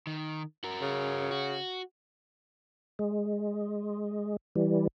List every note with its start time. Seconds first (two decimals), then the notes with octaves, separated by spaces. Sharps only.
0.07 D#3
0.64 F#4 A#4
0.81 C#3
1.31 F#4
2.99 G#3
4.56 E3 G3